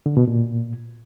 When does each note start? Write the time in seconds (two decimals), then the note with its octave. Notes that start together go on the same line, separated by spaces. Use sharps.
0.06 D3
0.17 B2
0.28 A#2